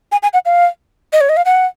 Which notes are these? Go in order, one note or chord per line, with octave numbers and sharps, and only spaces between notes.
G#5
G#5
F#5
F5
D#5
C#5
D#5
F5
F#5